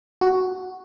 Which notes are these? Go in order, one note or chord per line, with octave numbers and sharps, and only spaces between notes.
F#4